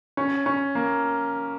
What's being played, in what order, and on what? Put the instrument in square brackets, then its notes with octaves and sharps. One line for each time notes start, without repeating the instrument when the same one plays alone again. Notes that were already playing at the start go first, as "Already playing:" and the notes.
[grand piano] C#4
C#4
A#3